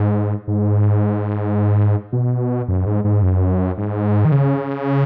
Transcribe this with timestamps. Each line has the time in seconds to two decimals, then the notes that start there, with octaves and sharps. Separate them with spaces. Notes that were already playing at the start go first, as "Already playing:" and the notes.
Already playing: G#2
0.48 G#2
2.13 B2
2.68 F#2
2.86 G#2
3.04 G#2
3.22 F#2
3.77 G#2
4.25 D#3
4.32 C#3